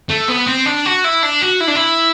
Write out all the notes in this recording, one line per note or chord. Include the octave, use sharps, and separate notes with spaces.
A3
B3
C4
D4
F#4
E4
D4
F#4
E4
D4
E4